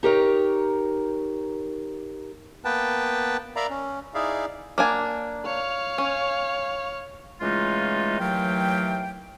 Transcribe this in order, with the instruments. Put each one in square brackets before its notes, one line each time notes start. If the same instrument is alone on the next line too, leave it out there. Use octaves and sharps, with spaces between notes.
[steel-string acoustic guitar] D#4 G4 A#4 C#5
[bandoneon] A#3 B3 B4 G5 A5
A#4 D5 E5 F5 A#5 B5
C#4
D#4 E4 G#4 D5 E5 F5
[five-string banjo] A#3 D4 G#5
[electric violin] C#5 F5
[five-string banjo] C#4
[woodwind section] C#3 E3 G#3 A3 D#4 F4
D#2 E3 F#3 A3 F5 G5